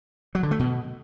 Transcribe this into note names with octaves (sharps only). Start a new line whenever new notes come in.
F#3
D3
A3
B2